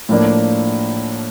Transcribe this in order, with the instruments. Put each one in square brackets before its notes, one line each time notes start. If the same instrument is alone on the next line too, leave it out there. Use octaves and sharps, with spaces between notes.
[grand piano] A2 F3 A#3 D4